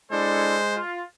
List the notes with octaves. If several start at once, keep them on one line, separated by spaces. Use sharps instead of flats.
G#3 D4 E4 A4 C5
F4